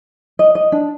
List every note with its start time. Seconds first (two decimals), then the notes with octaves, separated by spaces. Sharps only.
0.39 D#5
0.55 D#5
0.72 D4